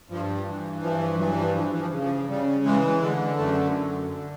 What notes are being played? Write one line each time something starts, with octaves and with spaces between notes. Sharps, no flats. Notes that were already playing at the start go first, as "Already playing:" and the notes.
G2 F3
E3
G2 F3
F3
E3 F#3
F3
E3 F3
E3
F3
C#3
F3
C#3 G3
E3 G#3
D3 G#3
F#2 A3
D3
D3